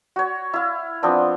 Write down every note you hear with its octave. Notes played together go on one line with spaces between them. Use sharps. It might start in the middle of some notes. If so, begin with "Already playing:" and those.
F#4 C#5
E4 F5
F3 B3 C4 D4